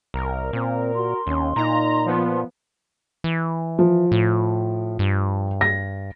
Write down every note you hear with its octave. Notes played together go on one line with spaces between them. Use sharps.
C2 A#4
A#2 C4
F#4 C6
D#2 C#4
A#2 D#4 A#5
F3 B3
E3
F3
A2
G2
A#6